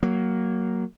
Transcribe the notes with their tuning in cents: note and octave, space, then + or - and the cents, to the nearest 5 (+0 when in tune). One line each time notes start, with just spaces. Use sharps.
F#3 +15 A#3 +0